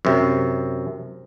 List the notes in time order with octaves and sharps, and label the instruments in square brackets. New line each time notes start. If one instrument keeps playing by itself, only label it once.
[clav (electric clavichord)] F#2 C3